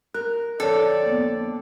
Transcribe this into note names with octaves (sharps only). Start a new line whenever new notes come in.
A#4 F#6
F2 D3 A4 C#5 D5
A#3 B3